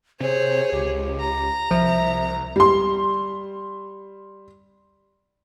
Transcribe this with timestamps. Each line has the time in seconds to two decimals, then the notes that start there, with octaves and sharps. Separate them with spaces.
0.20 C3 G#4 C5 C#5
0.72 C#2 G4
1.20 A#5
1.71 C2 F3 E5
2.56 G3 C6